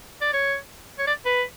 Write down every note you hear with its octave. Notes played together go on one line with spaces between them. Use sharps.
D5
C#5
C#5
D5
B4